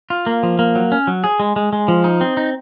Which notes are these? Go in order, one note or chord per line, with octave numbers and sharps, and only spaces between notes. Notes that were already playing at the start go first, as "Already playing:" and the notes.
F4
A#3
F3
A#3
F#3
C#4
F#3
G#4
G#3
G#3
G#3
F3
D#4
C4
D#4